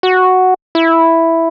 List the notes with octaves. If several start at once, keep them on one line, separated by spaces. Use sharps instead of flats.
F#4
E4